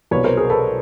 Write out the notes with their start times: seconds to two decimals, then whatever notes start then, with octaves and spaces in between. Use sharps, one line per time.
0.11 C2 B2 F#3 B4 C#5
0.24 A#4 C5
0.37 G#4 A#4
0.50 A4 B4